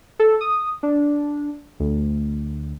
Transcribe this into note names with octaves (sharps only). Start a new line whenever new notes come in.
A4
D#6
D4
D2